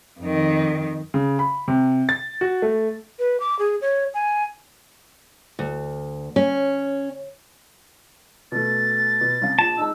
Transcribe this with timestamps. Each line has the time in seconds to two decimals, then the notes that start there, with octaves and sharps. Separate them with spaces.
0.21 F2 D#3
1.14 C#3
1.39 B5
1.68 C3
2.09 A6
2.41 F#4
2.62 A3
3.19 B4
3.40 D6
3.59 G#4
3.81 C#5
4.14 G#5
5.59 D2
6.36 C#4
8.52 B2 A3 A6
9.21 B2
9.42 C2 C#4 F5
9.59 A#1 A5
9.77 G#3 D#4 E6